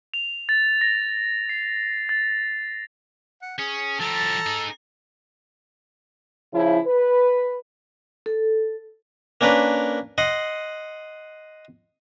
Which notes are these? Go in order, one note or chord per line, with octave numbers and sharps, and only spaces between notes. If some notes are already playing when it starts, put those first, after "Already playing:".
F7
A6
A#6
C7
A6
F#5
C#4 G#4
F3 G3 A4 A5 A#5
D#4 G#4
C#3 F3 E4
B4
A4
A#3 C#4 D4 A#4 B4
D#5 F#5 C6